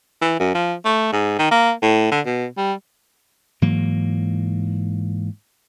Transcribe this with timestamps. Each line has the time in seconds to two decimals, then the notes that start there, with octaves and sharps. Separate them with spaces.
0.21 E3
0.40 F#2
0.54 F3
0.85 A3
1.12 G#2
1.39 D#3
1.51 A#3
1.82 A2
2.11 D3
2.26 B2
2.57 G3
3.62 G#2 E3 F#3 A#3